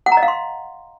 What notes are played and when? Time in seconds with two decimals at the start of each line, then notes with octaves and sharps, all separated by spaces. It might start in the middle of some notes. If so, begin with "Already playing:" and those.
0.06 F#5
0.12 A#5
0.17 D#5
0.23 F5
0.28 C6